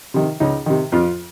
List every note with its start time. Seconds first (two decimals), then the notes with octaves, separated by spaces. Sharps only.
0.14 C3 D#3
0.40 C#2 D#4
0.66 C3 D#3
0.92 F2 F4